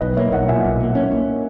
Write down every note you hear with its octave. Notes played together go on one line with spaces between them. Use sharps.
B1 B4 D#5
A#3 C#5 E5
B1 D#5 F#5
A#2 E5 G#5
B1
A#3
C#4
A#3